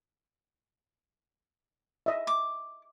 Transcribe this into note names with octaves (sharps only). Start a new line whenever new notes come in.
D#5 E5
D6